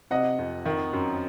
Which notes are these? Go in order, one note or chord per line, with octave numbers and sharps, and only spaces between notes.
C3 D#5 F#5
F2
D#3
F#2